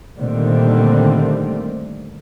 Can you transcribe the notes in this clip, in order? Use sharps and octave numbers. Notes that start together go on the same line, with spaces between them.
A#2 D3 D#3 G3 A3 C4